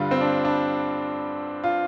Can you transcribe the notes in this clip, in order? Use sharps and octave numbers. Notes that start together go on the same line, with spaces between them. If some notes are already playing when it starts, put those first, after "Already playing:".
Already playing: G2 D3 G3 F4
C4
D4
D4
F4